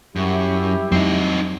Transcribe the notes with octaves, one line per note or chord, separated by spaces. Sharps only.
F#2 G3 E4 G4
F2 F#3 C4 D#4 C7